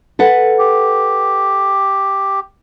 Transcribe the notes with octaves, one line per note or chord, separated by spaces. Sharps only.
A4 B4 F#5
G4